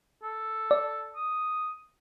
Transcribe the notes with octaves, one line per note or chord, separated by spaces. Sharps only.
A4
D5
D#6